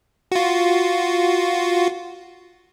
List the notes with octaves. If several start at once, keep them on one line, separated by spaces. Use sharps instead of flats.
F4 F#4